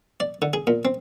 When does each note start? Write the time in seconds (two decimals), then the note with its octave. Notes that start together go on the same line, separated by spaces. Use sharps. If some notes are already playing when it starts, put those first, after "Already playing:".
0.20 D5
0.42 D3
0.53 G#4
0.67 A#2
0.85 C4